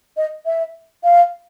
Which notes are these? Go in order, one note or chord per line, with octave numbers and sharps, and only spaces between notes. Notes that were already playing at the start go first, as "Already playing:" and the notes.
D#5
E5
F5